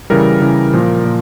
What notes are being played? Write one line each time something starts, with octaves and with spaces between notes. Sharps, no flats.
C#3 E3 G3 A#4
C#3 E3 G3
A#2 F3
A#2